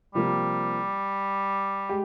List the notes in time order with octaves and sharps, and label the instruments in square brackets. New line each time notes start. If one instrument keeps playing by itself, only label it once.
[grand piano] C3 F3 A#3 [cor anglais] G3
[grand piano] G#3 G4